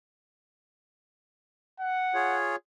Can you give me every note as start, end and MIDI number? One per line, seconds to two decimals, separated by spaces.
1.80 2.39 78
2.14 2.56 65
2.14 2.56 68
2.14 2.56 73